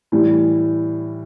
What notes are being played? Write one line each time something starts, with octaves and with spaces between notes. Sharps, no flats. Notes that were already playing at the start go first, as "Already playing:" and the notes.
A2 E3 G3